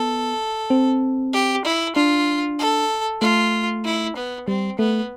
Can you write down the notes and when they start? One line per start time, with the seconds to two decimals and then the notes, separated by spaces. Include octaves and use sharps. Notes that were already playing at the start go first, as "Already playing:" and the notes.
Already playing: B3 A4
0.70 C4
1.33 G4
1.65 E4
1.96 D4 F4
2.60 A4
3.21 A3 F4
3.85 E4
4.16 B3
4.48 G3 C4
4.79 A3 B3